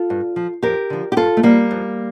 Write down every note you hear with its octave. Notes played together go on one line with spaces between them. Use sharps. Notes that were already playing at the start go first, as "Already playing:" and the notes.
Already playing: F4 A4
G2
F3
F2 G4 A#4
D3 F3
G4
G2 F4 A4
A3
D3 F3 G3 A#3
F2